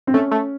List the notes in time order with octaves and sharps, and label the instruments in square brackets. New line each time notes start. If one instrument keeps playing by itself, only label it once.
[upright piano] C4
[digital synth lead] A3 [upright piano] C#4
[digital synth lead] A3